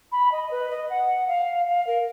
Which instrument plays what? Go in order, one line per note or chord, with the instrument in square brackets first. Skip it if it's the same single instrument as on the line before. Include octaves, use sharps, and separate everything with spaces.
[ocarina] B5
D#5
B4
D#5
F#5
F5
F5
A#4